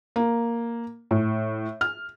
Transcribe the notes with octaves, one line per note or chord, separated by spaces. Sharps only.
A#3
A2
F6